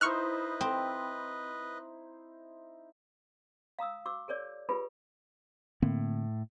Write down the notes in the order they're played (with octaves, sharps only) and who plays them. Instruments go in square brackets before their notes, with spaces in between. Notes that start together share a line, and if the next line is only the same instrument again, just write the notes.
[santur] D#4 E4 C5 [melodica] B4 D#5 [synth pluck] C#6 F6 F#6
[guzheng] C4
[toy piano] F5 A#5 D#6 E6
F#4 D6 E6
G#4 A#4 C#5 D5
F4 G4 G#4 A#4 B4 B5
[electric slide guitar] A2 [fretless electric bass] D3 A#3 C4